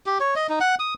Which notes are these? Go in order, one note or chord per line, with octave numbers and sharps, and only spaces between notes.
G4
C#5
D#5
D#4
F#5
D#6